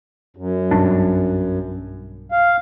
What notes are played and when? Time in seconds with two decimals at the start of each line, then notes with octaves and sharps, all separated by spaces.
0.37 F#2
0.71 B1 G2 D4
2.32 F5